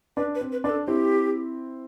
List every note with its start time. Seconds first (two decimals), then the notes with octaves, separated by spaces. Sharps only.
0.17 D4 B4
0.35 B4
0.41 C4
0.52 B4
0.64 D4 B4
0.70 A4
0.87 C4 E4 G4